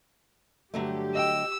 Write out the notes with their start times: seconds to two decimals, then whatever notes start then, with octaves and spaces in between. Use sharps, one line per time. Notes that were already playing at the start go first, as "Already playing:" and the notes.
0.74 G2 D3 F#3 A3 G4
1.15 D#5 F5 G5 E6